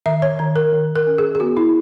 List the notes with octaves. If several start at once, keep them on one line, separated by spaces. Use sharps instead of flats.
D#3 E5
C#5
D#3 C#5
A#4
D#3
A#4
C#4
G#4
G#4
B3 F#4
E4